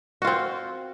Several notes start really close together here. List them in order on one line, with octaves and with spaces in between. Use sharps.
F#4 F4 C4